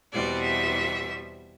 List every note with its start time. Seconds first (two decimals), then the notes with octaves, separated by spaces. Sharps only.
0.12 E2 B2 G3 C4 D5
0.43 E5